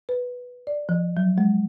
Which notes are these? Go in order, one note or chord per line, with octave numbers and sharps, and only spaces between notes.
B4
D5
F3
F#3
G#3